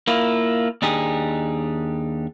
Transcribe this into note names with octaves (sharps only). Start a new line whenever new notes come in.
A#3 E4 F4
D#2 D4 D#4 G4 G#4